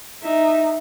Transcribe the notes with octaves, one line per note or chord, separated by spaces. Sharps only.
D#4 E5